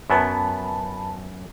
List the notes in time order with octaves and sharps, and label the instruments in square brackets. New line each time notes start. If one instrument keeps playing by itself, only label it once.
[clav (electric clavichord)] F#2 F#3 B3 [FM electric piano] B4 A5 B5